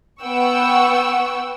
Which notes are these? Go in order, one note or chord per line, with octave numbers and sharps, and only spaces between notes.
B3 F#5 G5 C#6 E6